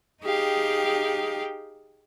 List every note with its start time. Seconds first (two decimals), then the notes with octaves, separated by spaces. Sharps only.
0.23 D#4 G4 G#4 F5 G5